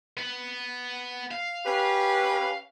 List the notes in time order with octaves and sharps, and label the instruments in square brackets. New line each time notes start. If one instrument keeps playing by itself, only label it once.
[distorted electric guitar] B3
F5
[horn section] C#4 G4 B4